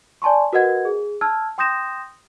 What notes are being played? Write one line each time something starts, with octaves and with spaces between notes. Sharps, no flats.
D5 G#5 A5 C6 C#6
F#4 A#4 B4 D#5 F#5 G#6
G#4
A5 E6 F6 G#6
G5 C6 D#6 G6 A#6 E7